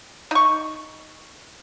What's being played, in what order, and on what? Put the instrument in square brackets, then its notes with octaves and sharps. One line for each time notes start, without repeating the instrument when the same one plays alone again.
[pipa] D#4 C#6